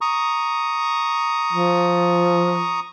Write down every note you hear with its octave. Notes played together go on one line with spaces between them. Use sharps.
A#5 C#6 D#6
F3